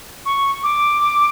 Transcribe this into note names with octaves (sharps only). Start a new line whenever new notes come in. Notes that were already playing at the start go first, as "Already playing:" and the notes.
C#6
D6